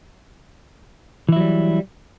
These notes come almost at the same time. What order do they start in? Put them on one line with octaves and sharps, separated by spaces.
E3 E4 F#3 G3